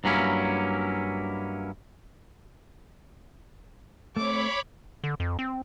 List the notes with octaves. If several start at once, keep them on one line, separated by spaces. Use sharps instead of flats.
G2 F#3 A#3 C#4 E4
A3 C4 C#5 B5 D6
D3
F2
C4